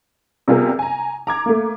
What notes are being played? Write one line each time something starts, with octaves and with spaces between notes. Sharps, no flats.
C3 G3 B3 F4 G#4 A#4
G#5 A#5
A#5 D6 G#6
A3 A#3